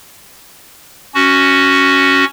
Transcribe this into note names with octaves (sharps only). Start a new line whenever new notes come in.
C#4 F#4